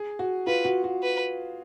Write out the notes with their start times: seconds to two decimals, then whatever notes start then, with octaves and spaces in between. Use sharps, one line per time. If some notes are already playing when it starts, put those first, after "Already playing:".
Already playing: G#4
0.19 F#4
0.47 F4 B4
0.65 F#4
0.84 F#4
1.03 B4